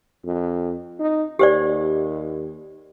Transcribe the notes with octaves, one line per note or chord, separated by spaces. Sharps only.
F2
D#4
D#2 G4 C5 D5